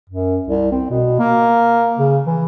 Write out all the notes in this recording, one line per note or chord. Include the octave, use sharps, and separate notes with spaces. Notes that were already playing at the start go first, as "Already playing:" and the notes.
F#2
C2
C4
B2
A#3
C#3
E3